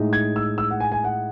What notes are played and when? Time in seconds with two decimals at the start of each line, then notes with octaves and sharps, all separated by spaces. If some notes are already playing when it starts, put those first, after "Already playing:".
Already playing: A2 G#3 D#4
0.13 G#6
0.36 E6
0.58 E6
0.71 F#5
0.80 G#5
0.92 G#5
1.04 F#5